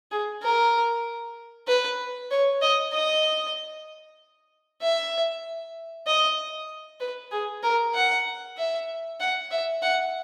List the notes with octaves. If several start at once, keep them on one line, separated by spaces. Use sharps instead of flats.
G#4
A#4
B4
C#5
D#5
D#5
E5
D#5
B4
G#4
A#4
F#5
E5
F#5
E5
F#5